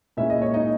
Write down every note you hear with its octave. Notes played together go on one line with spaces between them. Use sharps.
A#2 G#3 C#4 E4 E5
D#5
C#5
D#4 D#5